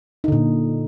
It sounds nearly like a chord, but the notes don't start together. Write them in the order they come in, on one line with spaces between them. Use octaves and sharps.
D#4 D3 A#2